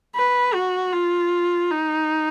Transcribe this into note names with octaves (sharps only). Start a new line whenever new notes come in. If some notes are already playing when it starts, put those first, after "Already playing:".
B4
F#4
F4
D#4